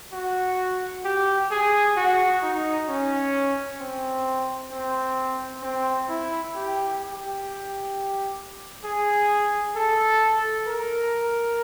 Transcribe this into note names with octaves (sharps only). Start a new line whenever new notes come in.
F#4
G4
G#4
F#4
D#4
C#4
C4
C4
C4
E4
G4
G4
G#4
A4
A#4